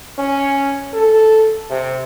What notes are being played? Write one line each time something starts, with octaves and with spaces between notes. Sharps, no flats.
C#4
A4
C3